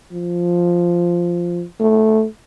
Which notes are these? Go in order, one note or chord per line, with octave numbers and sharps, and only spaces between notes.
F3
A3